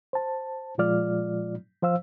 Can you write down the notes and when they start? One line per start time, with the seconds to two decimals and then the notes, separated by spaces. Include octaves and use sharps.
0.13 C5 A5
0.78 A#2 F3 G#3 F4 D5 F6
1.82 F3 C5 F5 E6